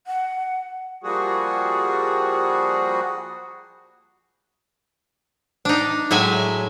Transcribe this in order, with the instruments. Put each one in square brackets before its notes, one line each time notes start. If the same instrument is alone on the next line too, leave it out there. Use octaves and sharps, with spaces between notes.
[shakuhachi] F#5
[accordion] F3 G3 A#3 F#4 G#4
[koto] D4 D#4
A2 F#3 G#3 E5 G#5